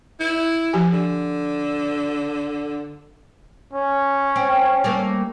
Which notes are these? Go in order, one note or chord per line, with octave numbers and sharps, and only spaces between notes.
E4
F3 G4 G#5
D3
C#4
C4
G3 A3 A#3